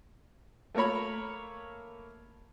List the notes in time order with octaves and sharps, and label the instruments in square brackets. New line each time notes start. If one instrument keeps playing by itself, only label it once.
[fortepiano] A3 A#3 A#4 C#5 B5